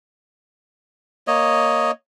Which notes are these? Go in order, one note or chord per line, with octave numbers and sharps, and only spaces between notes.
A#3 C#5 D#5